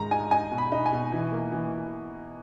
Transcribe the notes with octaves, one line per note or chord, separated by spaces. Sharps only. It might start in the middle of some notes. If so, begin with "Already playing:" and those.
Already playing: G#2 D#3 G#3 A#5
D#4 G#5
D#4 G#5
B2
B5
D#4
G#5
B2
E3
A#3
E3